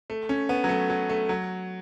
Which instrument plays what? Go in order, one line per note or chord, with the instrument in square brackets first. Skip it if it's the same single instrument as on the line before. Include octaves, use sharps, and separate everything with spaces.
[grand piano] A3
C#4
B3
F#3
A3
F#3
A3
F#3